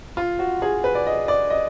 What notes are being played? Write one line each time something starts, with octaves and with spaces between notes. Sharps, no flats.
F4
F#4
G#4
B4
D5
D#5
D5
D#5